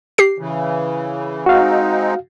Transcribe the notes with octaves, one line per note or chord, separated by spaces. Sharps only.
G4 C7
C#3 E3
G#3 C4 D#4 F#4 F5